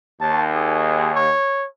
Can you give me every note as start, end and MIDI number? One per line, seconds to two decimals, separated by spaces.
0.21 1.28 39
0.21 0.43 81
0.55 1.13 68
1.15 1.67 73